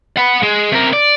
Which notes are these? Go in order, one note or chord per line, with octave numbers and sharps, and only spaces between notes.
F#5 B5
G#3
C3 A#4
D5